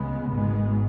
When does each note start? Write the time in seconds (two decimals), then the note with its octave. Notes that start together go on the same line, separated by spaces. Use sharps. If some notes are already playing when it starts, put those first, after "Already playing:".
Already playing: C#2 C#3 G#3 B3
0.30 G#1 G#2 G#3 B3